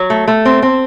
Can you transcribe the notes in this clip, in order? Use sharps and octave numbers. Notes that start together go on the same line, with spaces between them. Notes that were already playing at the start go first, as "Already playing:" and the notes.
Already playing: F#3
A3
A3
C4
C4